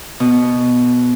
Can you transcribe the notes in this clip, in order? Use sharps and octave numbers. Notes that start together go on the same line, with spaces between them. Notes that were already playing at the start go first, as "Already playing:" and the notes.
B2